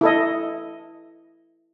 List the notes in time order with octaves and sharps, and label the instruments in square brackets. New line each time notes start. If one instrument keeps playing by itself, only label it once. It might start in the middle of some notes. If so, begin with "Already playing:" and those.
[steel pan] E4 A4 D#5